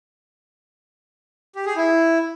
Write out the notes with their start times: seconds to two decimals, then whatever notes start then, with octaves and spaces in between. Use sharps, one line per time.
1.55 G4
1.66 G#4
1.76 E4